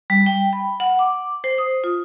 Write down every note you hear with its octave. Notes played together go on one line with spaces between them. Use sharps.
G3
G5
B5
F#5
D6
C5
D#6
F4